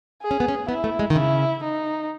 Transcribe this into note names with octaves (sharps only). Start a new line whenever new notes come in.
G#4
C#4
B3
C#4
B3 E4
A3
G#3
D#3
C#3 E4
D#4